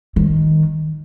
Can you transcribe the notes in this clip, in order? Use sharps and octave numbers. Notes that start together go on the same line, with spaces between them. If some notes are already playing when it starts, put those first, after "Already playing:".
D#3